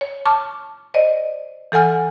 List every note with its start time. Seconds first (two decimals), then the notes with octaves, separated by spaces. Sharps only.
0.01 C#5
0.25 A5 C#6 D6 F6
0.94 C5 D5 D#5
1.72 E3 A4 F#5 G#5 F6